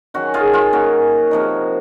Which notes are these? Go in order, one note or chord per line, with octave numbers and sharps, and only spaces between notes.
D#3 F#3 C#4 F#4
F4 G#4
F4
D#3 A#3 C#4 F#4
C3 F3 A#3 D#4